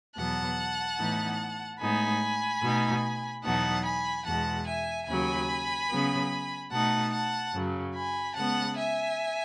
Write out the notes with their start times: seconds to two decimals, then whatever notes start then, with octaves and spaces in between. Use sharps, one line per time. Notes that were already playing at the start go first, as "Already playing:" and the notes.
0.16 E2 B2 F#3 B3 F#5 A5
0.98 A2 E3 B3 D#4
1.80 A2 G#3 B3 D#4 G#5 B5
2.63 B2 A3 D#4
3.44 E2 B2 F#3 B3 D#4 F#5 A5
3.85 G#5 B5
4.26 E2 B2 G#3 F#5 A5
4.67 E5 G#5
5.08 D#2 C#3 F#3 G#5 B5
5.90 C#3 F#3 B3
6.71 B2 A3 D#4 F#5 A5
7.12 F#5 A5
7.53 F#2 C#3 F#3
7.94 G#5 B5
8.35 C#3 G#3 B3 F#5 A5
8.76 E5 G#5